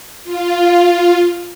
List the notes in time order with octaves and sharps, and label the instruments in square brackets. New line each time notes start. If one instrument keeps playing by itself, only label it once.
[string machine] F4